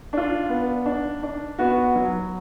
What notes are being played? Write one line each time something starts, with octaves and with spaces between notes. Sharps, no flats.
D4 F4
B3
D4
D4
B3 F#4
F#3